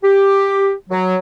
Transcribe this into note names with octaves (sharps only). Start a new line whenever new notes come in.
G4
F#3